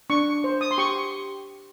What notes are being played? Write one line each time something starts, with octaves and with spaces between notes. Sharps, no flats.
D4 C#6
C5
D#6
C6
G4 C#6